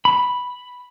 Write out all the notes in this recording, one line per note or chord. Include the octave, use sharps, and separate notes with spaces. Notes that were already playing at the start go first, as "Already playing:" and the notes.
B5